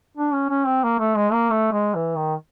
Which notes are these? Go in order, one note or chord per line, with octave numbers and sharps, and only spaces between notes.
D4
C#4
C#4
C4
A#3
A3
G#3
A#3
A3
G#3
E3
D#3